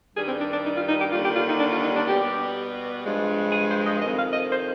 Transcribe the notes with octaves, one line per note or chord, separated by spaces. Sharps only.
G2 D#3 G3 G#4
C4
D4
D4
D#4
F4
D#4
G4
D#2 D3 G3 F4
G4
F4
D#4
D4
F4
D#4
D4
B2 G3 G4
G2 F3 G#3
G#4
C5
D#5
F2 C3 D#3 D#5
F5
D#5
C5